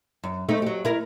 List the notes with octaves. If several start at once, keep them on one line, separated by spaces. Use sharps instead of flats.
F#2
A3 C4 D#4
F#3 G4
E4 A#4